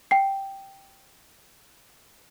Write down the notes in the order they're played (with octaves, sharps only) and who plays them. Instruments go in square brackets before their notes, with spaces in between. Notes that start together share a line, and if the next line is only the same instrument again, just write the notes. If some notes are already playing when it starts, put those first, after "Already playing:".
[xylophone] G5 C7